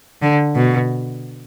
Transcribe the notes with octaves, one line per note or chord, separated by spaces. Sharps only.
D3
B2